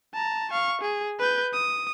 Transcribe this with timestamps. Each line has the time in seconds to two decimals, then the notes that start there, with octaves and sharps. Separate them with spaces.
0.14 A5 A#5
0.51 F5 C#6
0.81 G#4
1.19 B4 G6
1.53 D#6